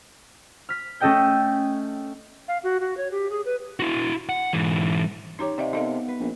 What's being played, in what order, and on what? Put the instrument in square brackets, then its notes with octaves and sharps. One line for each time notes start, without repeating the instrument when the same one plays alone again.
[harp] F6 B6
A3 C#4 A4 D#5 G5 G6
[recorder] F5
F#4
F#4
C#5
G4
G#4
B4
[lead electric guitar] E4 F#4
F#5
G#2 E3
[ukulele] C#4 G4 C#5 [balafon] D#4 A#5 D6
[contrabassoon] C3 [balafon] D5 D#5 F5
[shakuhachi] B3 [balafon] D#4 D#5 F5 [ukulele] A4 A#4
[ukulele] B4
[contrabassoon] A#1